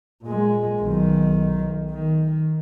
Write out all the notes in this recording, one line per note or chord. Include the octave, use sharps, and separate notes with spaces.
A#2 G#3
B1 D#3
D#3